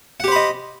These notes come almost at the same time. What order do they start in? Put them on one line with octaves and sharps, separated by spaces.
F#5 G4 C5 B5 D#5